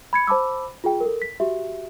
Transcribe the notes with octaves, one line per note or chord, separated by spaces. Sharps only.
B5 G#6 C#7
C5 A5 B5 D6 E6
F4 G#4 G5
A4 A#4
B6
F#4 G4 E5